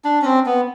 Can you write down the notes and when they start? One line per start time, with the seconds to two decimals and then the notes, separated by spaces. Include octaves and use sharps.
0.04 D4
0.22 C#4
0.25 C4
0.46 B3